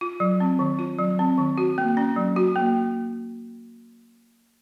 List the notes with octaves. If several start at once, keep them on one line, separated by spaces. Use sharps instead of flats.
F4
F#3
C4
D#3
F4
F#3
C4
D#3
F#4
A#3
C#4
F#3
F#4
A#3